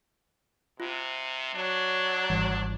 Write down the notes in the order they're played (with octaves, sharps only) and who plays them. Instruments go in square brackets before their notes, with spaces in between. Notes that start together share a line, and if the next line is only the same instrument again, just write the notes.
[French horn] C3 [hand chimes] F4
[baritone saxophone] F#3 [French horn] D4
[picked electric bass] G#1 E3 G3